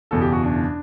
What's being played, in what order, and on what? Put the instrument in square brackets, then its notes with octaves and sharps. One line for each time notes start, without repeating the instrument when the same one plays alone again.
[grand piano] F#1 E2 B2 A4
G4
F#4
D4